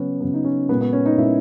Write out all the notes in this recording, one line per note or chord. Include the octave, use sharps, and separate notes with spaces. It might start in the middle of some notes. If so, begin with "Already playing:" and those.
Already playing: C#3 F#3 B3 C#4
C#3 F#3 B3
D#4
C#4
A#2 G#3 B3
B3
C#4
D#4
A#2 G#3 E4